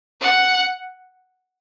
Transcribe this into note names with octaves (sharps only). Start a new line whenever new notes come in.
F#5